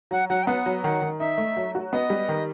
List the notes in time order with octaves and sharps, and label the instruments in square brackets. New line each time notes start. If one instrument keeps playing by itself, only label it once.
[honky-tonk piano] F#3 [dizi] F#5
[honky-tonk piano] F#3 [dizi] F#5
[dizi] G5
[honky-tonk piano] B3 [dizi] F#5
[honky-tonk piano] F#3
[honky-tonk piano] D#3 [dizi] F#5
[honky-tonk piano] D#3
[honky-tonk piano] D#4 [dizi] E5
[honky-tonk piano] A3
F#3
F#4
[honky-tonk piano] B3 [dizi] D#5
[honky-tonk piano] G3
D#3